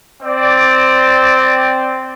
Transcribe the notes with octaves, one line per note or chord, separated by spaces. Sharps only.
C4 D5